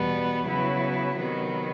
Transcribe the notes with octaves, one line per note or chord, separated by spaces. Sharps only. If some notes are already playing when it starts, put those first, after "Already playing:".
Already playing: E2 B2 G3 B3
C#3 F#3 B3 E4
C3 D#3 F#3 B3